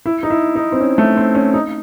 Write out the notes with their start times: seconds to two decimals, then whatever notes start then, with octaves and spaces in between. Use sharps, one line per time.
0.06 E4
0.23 D#4
0.30 E4
0.55 D#4
0.72 C4
0.80 C#4
0.98 A3
1.17 C4
1.35 C#4
1.54 D#4